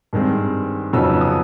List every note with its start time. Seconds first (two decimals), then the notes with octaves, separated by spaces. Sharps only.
0.13 G2 D#3 G#3 C4
0.93 F2 C#3 F#3 B3 D#4 E6
1.21 D#6